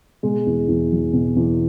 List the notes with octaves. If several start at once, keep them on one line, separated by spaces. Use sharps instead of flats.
B2 G#3
E2
E2
F#3
B2
E2